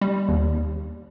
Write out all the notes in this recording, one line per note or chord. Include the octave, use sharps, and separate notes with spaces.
G3
D#2